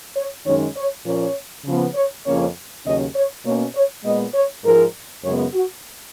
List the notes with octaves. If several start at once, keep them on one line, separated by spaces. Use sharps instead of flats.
C#5
F#2 D#3 G#3 C#4 C#5
C#5
A#2 F3 A#3 C#4 C#5
C#3 F3 B3
C#5
F2 C#3 F3 A#3 C#4 C#5
D#2 C#3 F#3 C#4 D#5
C#5
B2 A#3 C#4 C#5
C#5
A#2 G#3 B3 D#5
C#5
G#2 F3 G#3 A#4
F#2 C#3 G#3 B3 C#5
F#4